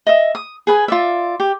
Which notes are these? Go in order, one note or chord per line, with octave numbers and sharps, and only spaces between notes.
D#5 E5
D#6
G#4 B4 G#5
F4 D5 E5
G4